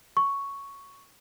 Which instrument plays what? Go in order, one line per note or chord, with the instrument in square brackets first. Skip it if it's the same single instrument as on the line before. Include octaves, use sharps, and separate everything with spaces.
[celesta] C#6